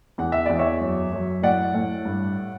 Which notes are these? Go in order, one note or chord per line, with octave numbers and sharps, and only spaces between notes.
E2 F#5
E5
E2 D5
C#5 E5
F#2
F#2
A2 D5 F#5
A2
G2